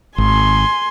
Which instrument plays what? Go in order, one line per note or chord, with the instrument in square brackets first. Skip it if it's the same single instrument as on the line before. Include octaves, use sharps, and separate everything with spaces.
[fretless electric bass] G#1 [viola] G#5 C6